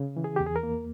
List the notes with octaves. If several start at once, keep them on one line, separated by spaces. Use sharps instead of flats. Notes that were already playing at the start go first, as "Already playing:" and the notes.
Already playing: C#3
E3
G#4
E2 G4
G#4
A#4
A#3